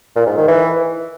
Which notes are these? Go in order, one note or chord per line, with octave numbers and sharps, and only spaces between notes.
A#2
G#2
D#3
E3